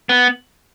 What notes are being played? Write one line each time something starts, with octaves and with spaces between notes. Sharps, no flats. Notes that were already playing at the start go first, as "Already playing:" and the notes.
B3